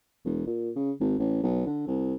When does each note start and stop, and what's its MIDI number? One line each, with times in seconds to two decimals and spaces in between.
0.25 0.46 28
0.46 0.70 46
0.76 0.91 49
1.00 1.15 32
1.19 1.40 33
1.43 1.65 35
1.66 1.86 50
1.87 2.14 36